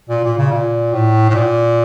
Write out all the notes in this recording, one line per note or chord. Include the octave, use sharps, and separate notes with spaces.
A#2
A#2
C#3
A#2
A2
A2
A#2